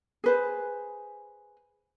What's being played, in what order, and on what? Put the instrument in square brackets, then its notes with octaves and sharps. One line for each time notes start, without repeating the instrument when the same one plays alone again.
[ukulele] G#4 B4 C5